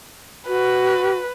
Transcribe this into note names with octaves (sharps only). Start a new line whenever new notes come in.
F#4 B4